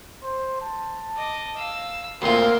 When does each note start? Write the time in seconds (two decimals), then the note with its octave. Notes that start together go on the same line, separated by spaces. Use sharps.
0.23 C5
0.61 A5
1.16 D#5 D6
1.56 F5 E6
2.22 D2 A#2 C4 A#4 C6